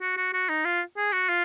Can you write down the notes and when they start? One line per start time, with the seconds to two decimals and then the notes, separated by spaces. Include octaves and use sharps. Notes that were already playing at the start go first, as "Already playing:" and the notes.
0.01 F#4
0.17 F#4
0.33 F#4
0.49 D#4
0.65 F4
0.97 G#4
1.13 F#4
1.29 F4